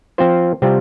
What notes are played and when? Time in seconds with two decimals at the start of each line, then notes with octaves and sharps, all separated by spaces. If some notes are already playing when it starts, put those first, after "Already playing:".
0.18 F3 C4 F4 C5
0.62 C3 G3 C4 F4